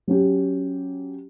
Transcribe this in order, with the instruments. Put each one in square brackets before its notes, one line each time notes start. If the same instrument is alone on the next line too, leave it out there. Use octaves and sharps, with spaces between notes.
[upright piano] F#3 C#4 G4